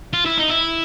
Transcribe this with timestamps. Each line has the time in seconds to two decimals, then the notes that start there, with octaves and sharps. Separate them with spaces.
0.13 F4
0.25 E4
0.37 D#4
0.49 E4